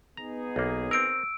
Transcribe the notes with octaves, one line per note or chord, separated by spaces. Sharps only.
B3 D#4 G#4 A#5
B1 A#3
C4 A#4 E6 D7